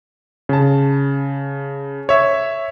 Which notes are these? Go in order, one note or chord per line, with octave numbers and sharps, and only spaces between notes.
C#3 A5
C#5 E5